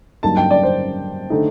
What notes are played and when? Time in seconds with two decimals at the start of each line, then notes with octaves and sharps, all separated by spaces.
0.23 G2 F#3 A#3 D#4 A5
0.37 G5
0.51 D5
0.63 C5
1.30 D3 A3 D#4